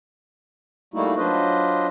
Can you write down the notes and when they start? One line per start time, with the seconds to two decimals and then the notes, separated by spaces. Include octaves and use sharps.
0.94 G3 A3 A#3 D#4 E4 F#4
1.17 F#3 D4 F4 B4 C5 D#5